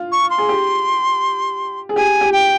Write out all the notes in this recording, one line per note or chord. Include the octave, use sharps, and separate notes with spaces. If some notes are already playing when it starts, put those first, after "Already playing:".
Already playing: F4
C#6
C6
G#4
G4
G#4
G4 G#5
G4
G5